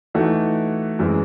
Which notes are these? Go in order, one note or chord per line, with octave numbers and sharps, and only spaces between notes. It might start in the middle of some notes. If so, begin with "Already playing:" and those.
E3 A3 D#4 F#4
F#2 E3 G#3 C4